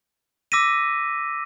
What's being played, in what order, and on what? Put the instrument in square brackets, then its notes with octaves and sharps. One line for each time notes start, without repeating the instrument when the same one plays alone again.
[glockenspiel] D6 E6 A#6 B6 D#7